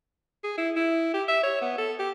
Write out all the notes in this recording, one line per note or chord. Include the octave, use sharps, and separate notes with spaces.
G#4
E4
E4
G4
E5
C#5
B3
A4
G4